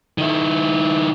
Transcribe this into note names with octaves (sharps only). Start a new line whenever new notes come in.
D#3 E4